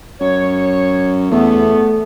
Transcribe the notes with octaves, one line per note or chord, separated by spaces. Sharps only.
F#2 C#5
E2 A3 B3